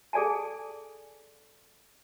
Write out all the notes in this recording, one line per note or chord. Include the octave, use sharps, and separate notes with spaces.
G#4 A4 D5 G#5 A5